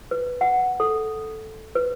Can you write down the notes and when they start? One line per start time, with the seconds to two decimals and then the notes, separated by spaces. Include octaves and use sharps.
0.11 B4
0.41 F#5
0.80 A4
1.75 B4